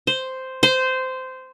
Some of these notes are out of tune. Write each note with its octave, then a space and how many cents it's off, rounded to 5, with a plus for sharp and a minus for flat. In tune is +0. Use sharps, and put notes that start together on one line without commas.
C5 -5
C5 -15